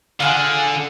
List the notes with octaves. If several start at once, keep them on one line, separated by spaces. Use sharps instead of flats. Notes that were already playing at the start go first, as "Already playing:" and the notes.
D3 F4 G#4 F#5